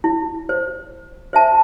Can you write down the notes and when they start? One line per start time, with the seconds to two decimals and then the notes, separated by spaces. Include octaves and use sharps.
0.04 E4
0.49 C5
1.33 C5 E5 A5